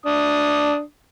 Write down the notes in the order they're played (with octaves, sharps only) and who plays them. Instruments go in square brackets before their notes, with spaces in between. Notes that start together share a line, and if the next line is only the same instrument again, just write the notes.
[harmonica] D4 D#6